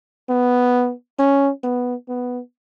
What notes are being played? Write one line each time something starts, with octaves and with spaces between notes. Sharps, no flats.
B3
C#4
B3
B3